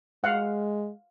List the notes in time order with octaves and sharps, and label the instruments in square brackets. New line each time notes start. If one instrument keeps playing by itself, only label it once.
[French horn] G#3 [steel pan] F5 F#5